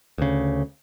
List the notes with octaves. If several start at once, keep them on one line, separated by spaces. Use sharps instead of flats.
D2 C#3